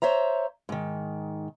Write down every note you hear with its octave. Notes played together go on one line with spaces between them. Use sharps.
C5 C#5 E5 A#5
G#2 D#3